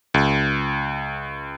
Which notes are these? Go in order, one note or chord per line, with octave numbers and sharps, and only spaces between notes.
C#2